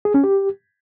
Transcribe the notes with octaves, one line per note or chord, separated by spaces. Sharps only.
G#4
C#4
G4